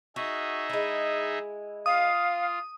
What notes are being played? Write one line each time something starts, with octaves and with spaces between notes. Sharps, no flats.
D#4 F#4 G#4 E5
G#3 E4
F4 F5 D#6